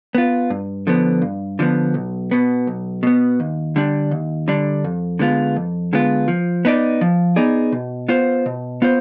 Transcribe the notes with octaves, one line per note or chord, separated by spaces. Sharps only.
B3 F4
G2
D3 F3 B3
G2
D3 F3 B3
B1
B2 B3
B1
B2 B3
D#2
D3 G3 D4
D#2
D3 G3 D4
F2
D3 G#3 B3 F4
F2
D3 G#3 B3 F4
F3
B3 D#4 G#4 D5
F3
B3 D#4 G#4 D5
B2
B3 F4 C5
B2
B3 F4 C5